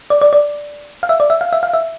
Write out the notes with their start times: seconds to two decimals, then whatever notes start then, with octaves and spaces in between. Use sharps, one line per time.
0.10 D5
0.22 D5
0.33 D5
1.03 F5
1.09 E5
1.20 D5
1.30 E5
1.41 F5
1.53 E5
1.63 F5
1.73 E5